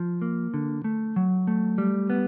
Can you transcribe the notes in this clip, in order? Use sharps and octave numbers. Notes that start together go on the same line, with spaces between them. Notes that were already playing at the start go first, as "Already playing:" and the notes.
Already playing: F3
A#3
D3
A3
F#3
A3
G3
B3